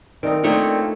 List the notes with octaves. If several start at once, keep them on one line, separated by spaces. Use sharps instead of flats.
D#3 A3 C4 A#4 D5 D#6
A3 A#3 C4 D4 D#4 F4 C#5